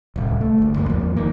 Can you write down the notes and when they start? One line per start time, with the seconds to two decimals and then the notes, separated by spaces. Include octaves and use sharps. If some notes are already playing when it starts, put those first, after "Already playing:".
0.16 D1 C2
0.41 A3
0.58 G1 D2
0.76 D2 G2 A#3
0.90 E2 G#2 F3 A#3
1.16 F#1 D#3 A#3